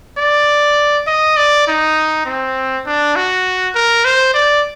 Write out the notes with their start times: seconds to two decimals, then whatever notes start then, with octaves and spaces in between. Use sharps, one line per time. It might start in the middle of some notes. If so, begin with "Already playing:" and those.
0.18 D5
1.07 D#5
1.37 D5
1.67 D#4
2.26 C4
2.86 D4
3.16 F#4
3.75 A#4
4.05 C5
4.34 D5